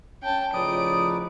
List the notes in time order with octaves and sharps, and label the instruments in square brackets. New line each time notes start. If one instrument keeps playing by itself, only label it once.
[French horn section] C#4 [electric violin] G5 A5
[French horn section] A2 C#3 F3 [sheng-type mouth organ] D#4 B4 D5 [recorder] D#6 [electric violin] D7